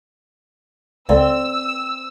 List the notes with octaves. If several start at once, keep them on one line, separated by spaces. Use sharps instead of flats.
C#2 C4 A4 D5 E6